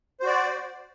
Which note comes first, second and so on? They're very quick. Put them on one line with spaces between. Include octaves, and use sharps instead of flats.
C5 F#4 D5